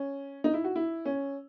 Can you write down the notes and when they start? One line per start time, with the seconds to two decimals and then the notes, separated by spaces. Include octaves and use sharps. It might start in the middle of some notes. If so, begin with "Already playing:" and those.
Already playing: C#4
0.44 D#4
0.54 E4
0.64 F#4
0.76 E4
1.05 C#4